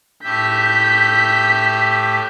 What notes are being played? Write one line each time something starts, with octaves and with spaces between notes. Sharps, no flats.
A2 G4 E5 G6 B6